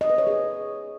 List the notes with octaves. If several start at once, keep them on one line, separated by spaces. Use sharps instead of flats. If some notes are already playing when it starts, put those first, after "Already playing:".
D#5
B4
C#5
G#4